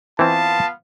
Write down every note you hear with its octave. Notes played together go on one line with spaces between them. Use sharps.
E3 B3 C4 F4 F5 A5